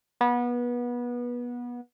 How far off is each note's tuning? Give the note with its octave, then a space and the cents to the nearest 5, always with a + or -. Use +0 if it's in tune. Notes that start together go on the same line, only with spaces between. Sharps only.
B3 -25